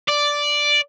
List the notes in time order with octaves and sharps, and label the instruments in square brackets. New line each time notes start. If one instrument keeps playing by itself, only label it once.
[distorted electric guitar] D5